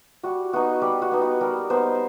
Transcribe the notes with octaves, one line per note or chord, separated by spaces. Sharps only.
G3 F#4
B3 D#4 F#4
G3 G4
F#4
B3 D#4
F#4
G3 A#4
B3 D#4 C5